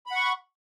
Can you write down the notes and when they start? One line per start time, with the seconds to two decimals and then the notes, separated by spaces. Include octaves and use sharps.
0.06 B5
0.11 F#5
0.16 C#6